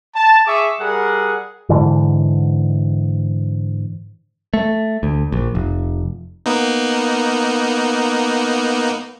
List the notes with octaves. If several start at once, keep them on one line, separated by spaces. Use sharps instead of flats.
A5
G#4 E5 C#6 D6
G3 G#4 A#4 F#5
G#2 D3 E3
A3
D2
A#1
F1
A#3 B3 D#4